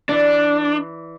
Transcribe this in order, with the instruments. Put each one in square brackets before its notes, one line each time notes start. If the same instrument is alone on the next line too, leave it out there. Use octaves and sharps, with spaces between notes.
[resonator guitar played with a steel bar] E3 D5 [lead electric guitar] D4